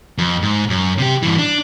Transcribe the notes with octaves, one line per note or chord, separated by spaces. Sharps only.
F2
G#2
F#2
C3 G4
G2 E3
D4